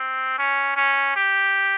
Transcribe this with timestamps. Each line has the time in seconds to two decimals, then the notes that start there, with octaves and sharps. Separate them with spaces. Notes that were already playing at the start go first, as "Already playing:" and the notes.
Already playing: C4
0.38 C#4
0.77 C#4
1.16 G4